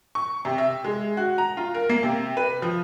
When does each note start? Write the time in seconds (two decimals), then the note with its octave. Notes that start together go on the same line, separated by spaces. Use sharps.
0.15 C#6
0.45 C3
0.58 E5
0.84 G#3
1.17 F#4
1.38 A#5
1.57 F4
1.74 A#4
1.89 A#3
2.03 C3
2.37 B4
2.62 F3